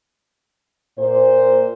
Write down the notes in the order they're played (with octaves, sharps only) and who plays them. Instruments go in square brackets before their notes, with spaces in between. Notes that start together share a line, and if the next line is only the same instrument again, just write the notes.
[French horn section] A#2 C5